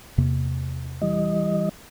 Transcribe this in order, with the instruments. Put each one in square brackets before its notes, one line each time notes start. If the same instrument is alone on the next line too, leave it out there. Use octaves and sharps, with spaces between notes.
[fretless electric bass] E2 C3 A#3
[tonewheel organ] E3 G3 D#5